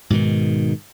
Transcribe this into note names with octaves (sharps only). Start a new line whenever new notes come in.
G#2 B2 D3 D#3